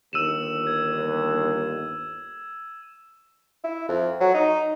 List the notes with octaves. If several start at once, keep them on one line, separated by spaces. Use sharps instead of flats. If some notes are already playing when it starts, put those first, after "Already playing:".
G1 D#2 E6 D#7 E7
G#6
E4
F2
F#3
D#4